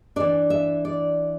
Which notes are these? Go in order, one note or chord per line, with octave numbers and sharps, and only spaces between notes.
E3 D4 D5
E5
D5